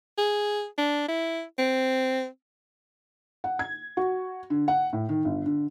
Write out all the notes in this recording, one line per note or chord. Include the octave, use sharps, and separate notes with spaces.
G#4
D4
E4
C4
F#5
G#6
F#4
D3
F#5
A2
D#3
G1
D3